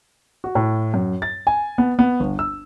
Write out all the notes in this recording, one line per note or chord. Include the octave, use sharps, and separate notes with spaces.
F#4
A2
F#2
A6
G#5
B3
B3
G1
E6